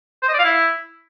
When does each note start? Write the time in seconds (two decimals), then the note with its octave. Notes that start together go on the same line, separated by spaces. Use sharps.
0.23 C5
0.28 D#5
0.33 D5
0.39 F5
0.44 E4